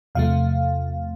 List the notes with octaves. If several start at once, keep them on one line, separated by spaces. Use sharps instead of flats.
E2 C3 F3 A3 F5